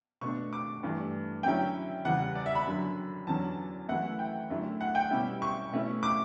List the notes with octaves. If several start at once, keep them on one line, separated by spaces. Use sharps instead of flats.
B2 A3 D4 C#6
D6
G2 E3 A3
D3 F#3 C#4 E4 G5
E2 C#3 G3 F#5
D5
E5
B5
F#2 D3 F#3
E2 D3 F#3 C#4 A5
F#2 E3 A3 E4 F#5
G5
F#2 D3 A3 E4
F#5
G5
B2 G3 C#4 E4
C#6
B2 A3 C#4 E4
D6